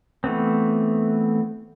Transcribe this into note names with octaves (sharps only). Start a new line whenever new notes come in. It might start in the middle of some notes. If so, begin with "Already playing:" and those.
E3 A3 B3 C4